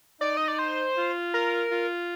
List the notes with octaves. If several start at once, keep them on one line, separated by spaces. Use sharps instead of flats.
D#4 D5
D#5
D5
C5
F4
A#4
F4